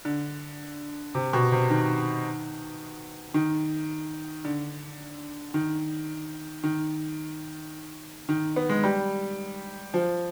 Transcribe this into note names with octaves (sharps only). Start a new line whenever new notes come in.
D3
C3
B2
C3
D#3
D#3
D3
D#3
D#3
D#3
B3
G#3
G3
F3